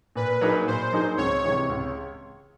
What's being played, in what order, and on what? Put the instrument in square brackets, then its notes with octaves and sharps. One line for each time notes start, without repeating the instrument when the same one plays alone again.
[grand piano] A#2 [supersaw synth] B4
[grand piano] F#3 A#3 D#4 G#4
[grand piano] A#2 [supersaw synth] C5
[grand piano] F#3 A#3 D#4 G#4
[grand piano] C#2 [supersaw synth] C#5
[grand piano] C3 E3 G#3
C#2